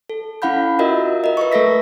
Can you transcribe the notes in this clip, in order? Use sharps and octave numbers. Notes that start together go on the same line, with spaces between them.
A4
C#4 E4 F5 F#5 B5 G6
F4 F#4 A#4 D#5 E5
A#4 D#5
B4 E5 C#6
A3 A4 E5 A#6 B6